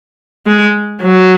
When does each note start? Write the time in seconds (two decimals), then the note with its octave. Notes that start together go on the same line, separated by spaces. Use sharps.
0.46 G#3
1.02 F#3